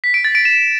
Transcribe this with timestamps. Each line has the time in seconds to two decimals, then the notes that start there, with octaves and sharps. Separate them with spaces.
0.04 B6
0.14 D7
0.24 A6
0.35 D7
0.45 E7